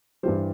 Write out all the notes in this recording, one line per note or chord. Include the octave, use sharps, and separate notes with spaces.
G2 E3 G3 C5